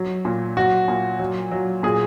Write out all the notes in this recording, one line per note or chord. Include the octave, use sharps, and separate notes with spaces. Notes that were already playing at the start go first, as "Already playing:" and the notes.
Already playing: F#3
A#2
F#3 F#4
A#2
F#3
F#3
A#2 G#4